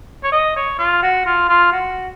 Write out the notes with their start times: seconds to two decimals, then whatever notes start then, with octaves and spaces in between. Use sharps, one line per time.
0.24 C#5
0.32 D#5
0.56 C#5
0.79 F4
1.03 F#4
1.26 F4
1.49 F4
1.72 F#4